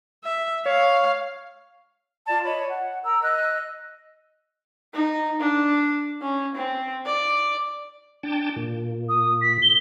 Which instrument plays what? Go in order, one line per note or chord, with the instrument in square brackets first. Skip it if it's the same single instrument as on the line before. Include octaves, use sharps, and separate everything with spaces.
[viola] E5
[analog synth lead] C#5 [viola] F5
[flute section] F4 D5 A5
C#5 D#5 B5
F#5
A#4 A#5 E6
D#5 E6 F#6
[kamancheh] D#4
D4
C#4
C4
D5
[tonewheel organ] D4 G5 A5
A#2
[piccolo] D#6
B6
G7